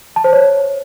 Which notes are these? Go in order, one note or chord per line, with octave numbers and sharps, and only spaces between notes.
A5
C5
C#5